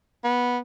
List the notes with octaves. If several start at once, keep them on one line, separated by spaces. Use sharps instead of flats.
B3